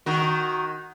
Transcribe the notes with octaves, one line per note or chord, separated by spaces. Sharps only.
D#3 F#4